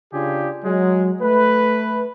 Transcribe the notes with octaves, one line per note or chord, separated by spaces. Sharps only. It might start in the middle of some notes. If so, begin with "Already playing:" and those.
C#3 D4 F4 G4 G#4
F#3 G#3
A3 B4